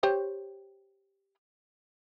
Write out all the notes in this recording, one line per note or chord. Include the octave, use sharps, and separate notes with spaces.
G4 C5 C#5